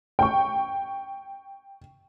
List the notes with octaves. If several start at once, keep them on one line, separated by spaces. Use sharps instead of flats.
G5 C#6